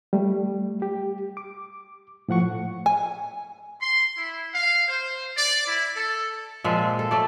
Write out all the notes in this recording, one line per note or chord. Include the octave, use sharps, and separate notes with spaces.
G3 A3
G4
D6
A2 F3 F#5 C#6
G#5
C6
E4
F5
C5
D5
E4
A4
A#2 F3 G#3 E5
A4
A3 D5